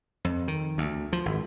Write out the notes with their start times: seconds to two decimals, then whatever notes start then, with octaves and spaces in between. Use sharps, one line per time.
0.25 F2
0.48 D#3
0.78 D2
1.13 F3
1.25 G#1